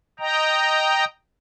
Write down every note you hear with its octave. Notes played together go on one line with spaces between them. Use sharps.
D#5 G5 A#5